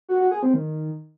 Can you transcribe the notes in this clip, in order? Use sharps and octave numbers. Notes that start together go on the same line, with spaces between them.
F#4
F#4
G#4
C4
D#3